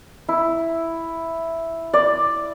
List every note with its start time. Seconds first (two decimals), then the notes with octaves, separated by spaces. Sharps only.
0.29 E4
1.93 D5